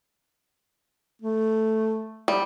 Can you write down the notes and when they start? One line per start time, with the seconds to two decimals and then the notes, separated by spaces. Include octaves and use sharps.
1.22 A3
2.28 G3